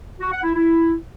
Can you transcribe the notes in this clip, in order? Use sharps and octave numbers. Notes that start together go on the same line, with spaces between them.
F#4
F#5
E4
E4